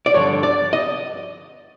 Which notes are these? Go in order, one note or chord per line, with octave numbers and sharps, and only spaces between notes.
D5
G2 D3 F3 C#5
D5
D#5